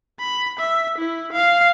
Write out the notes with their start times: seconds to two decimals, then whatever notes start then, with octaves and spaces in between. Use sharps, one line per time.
0.20 B5
0.59 E5
0.98 E4
1.33 F5